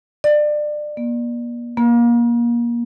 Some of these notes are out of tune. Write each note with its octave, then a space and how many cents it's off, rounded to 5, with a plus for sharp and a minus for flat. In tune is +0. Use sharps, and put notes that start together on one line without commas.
D5 +25
A#3 +40
A#3 +25